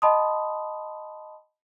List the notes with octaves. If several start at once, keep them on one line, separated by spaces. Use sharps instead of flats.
D#5 G5 A5 B5 C6 D#6